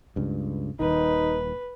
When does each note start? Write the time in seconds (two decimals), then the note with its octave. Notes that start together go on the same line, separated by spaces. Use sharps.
0.16 C#2 G2
0.80 D#1 B1 D#3 D#4 B4